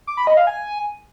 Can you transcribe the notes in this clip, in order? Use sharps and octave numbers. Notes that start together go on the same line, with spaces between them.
D6
B5
D#5
F5
G#5